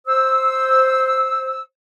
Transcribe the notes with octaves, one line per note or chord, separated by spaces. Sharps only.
C5 E6